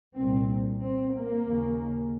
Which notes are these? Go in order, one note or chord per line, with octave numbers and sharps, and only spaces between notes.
C2 A#2 C4
C4
A#3
D#2 C#3